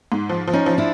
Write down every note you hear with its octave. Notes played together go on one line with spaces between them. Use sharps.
G#2
F3
F3
C#4 D#4
F3
D4 E4